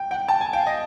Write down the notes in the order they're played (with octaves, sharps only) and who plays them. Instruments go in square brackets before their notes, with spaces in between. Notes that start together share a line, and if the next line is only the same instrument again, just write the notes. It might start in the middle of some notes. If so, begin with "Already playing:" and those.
Already playing: [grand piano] G5
[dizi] F#5 [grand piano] G5
[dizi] G5 [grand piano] A5
[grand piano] G#5
[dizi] F5 [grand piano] G5
[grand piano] D#5